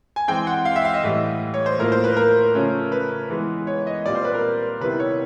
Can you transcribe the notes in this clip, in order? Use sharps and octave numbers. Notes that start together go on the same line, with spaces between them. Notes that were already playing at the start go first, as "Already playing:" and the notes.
G#5
E3 G#3 C4 G5
F#5
F5
E5
F5
D#5
A2 E3 G3
C#5
C5
A2 F3 A#3 A#4
C5
B4
A#4
C#3 F3 A3 C#4
B4
E3 G#3 B3
C#5
D#5
A#2 G3 C4 F4 D5
C5
B4
A#4
C3 D#3 G3 B3 E4 B4
C#5